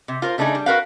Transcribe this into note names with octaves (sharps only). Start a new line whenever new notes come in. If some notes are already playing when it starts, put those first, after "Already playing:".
C3
F4 A#4 C5
C#3 A3 D4 D#4 G#4
G3
F#4 A#4 B4 F5